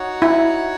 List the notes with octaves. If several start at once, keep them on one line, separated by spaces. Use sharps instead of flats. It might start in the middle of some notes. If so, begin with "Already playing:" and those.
Already playing: D#4 F#4 C#5 F#5
E4